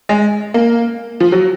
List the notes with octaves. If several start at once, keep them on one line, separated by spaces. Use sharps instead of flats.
G#3
A#3
F3
F#3